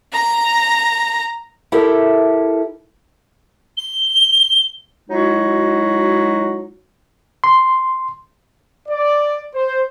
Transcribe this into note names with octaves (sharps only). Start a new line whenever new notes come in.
A#5
E4 G4 A4 A#4 E5
G7
F#3 G#3 D#4 E4 F#4
C6
D5
C5